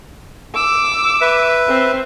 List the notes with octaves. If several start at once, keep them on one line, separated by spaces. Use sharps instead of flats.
D6 E6
B4 E5
C4 C5